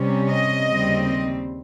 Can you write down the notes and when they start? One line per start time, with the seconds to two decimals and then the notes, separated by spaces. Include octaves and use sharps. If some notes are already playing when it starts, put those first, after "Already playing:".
Already playing: C3 G3 C#4
0.30 D#5
0.69 D#2 C#3 G3 C4